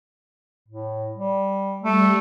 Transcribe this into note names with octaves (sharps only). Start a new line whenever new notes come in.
A2
G3
G3 A3